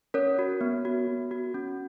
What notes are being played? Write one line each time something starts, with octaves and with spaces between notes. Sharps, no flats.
C#4 A#4 C#5
F#4
B3
F#4
B3
F#4
C#4